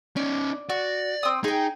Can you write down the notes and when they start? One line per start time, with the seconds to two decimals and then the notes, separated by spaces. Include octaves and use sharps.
0.16 C#4 D#4 D5
0.70 F#4 D5
1.23 C4 D#6
1.44 D#4 G#4 G5